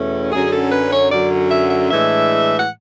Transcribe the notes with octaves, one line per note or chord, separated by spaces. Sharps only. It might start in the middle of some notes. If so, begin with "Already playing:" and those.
Already playing: E2 B2 A3 C#4
F#2 D3 F#3 C#4 G#4
A4
B4
C#5
F#2 D3 F#3 C#4 D5
E5
E5
A2 E3 G#3 D4 E5
F#5